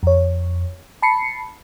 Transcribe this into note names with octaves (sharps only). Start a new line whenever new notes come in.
F2 C#5
A5 B5 C7 C#7